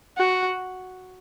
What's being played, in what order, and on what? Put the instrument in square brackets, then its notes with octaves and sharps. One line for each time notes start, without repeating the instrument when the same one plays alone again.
[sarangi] F#4